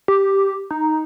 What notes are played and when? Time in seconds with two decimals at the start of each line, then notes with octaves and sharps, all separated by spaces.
0.08 G4
0.71 D#4